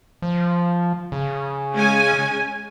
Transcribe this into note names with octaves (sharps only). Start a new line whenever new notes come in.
F3
C#3
G#3 C#4 G#5